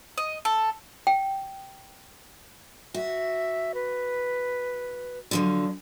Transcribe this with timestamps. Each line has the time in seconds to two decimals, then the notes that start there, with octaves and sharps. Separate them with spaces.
0.18 D#5
0.45 A4
1.07 G5
2.94 F#4 E5
3.74 B4
5.31 D3 F3 F#3